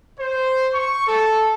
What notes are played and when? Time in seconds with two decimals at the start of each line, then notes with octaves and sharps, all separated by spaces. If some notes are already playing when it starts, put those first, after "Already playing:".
0.20 C5
0.74 C#6
1.08 A4